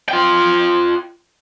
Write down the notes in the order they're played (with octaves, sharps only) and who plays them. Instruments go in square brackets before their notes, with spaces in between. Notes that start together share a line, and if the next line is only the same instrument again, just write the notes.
[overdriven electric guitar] F4 G5